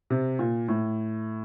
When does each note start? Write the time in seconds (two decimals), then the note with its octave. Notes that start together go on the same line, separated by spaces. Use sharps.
0.10 C3
0.39 A#2
0.68 A2